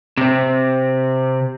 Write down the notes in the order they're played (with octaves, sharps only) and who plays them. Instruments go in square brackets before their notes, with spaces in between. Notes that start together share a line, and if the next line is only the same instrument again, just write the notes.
[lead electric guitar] C3 C4